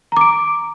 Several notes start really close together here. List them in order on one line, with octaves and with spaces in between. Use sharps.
A#5 D6 D7